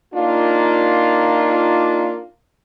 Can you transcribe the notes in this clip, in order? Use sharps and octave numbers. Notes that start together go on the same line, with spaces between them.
A#3 D4 D#4 F4